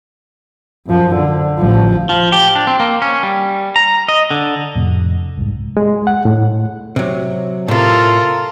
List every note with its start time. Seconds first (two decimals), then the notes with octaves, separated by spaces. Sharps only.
0.86 F#2 F3
1.16 D3
1.59 A1 F3
2.09 F3
2.32 G4
2.56 D4
2.67 C4
2.80 A#3
3.02 C#4
3.23 G3
3.76 A#5
4.08 D#5
4.31 D3
4.75 F2 A2 C3
5.37 C2 G#2
5.77 G#3
6.07 F#5
6.25 A2
6.96 C3 F#3
7.68 A2 C3 F4 A4 A#4